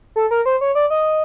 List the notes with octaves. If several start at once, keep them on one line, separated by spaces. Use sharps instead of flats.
A4
A#4
C5
C#5
D5
D#5